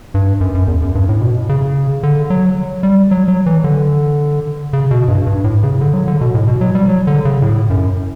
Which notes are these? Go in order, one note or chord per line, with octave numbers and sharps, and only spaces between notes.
G2
F#2
F#2
E2
F#2
G2
A2
B2
C#3
D3
F#3
G3
F#3
F#3
E3
D3
C#3
B2
G2
G2
A2
C#3
D3
F#3
D3
B2
A2
B2
F#3
G3
F#3
D3
C#3
A2
F#2